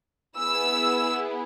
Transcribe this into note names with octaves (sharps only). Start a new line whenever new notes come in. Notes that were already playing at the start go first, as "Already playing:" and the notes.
B3 E4 G#4 E6